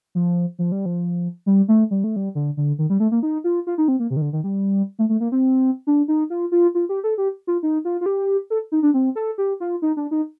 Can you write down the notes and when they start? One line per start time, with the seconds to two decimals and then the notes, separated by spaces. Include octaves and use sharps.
0.15 F3
0.59 F3
0.72 G3
0.86 F3
1.46 G3
1.68 A3
1.91 G3
2.04 A3
2.16 G3
2.35 D3
2.57 D3
2.79 D#3
2.90 G3
3.00 A3
3.12 A#3
3.23 D#4
3.44 F4
3.67 F4
3.78 D#4
3.88 C4
3.99 A#3
4.11 C3
4.16 D#3
4.22 D3
4.33 D#3
4.44 G3
4.99 A3
5.09 A3
5.20 A#3
5.32 C4
5.87 D4
6.08 D#4
6.30 F4
6.52 F4
6.75 F4
6.89 G4
7.04 A4
7.18 G4
7.47 F4
7.63 D#4
7.85 F4
8.01 F4
8.06 G4
8.50 A4
8.72 D#4
8.83 D4
8.94 C4
9.15 A4
9.38 G4
9.60 F4
9.82 D#4
9.97 D4
10.11 D#4